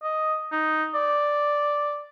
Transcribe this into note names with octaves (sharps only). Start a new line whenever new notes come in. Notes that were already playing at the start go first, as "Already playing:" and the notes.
D#5
D#4
D5